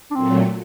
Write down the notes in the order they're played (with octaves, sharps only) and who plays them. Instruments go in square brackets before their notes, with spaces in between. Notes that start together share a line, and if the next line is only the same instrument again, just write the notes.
[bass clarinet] D4
[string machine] A#2 F#3 A3 [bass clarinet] C4